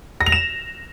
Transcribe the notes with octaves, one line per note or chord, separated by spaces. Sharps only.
A#6
F7
E7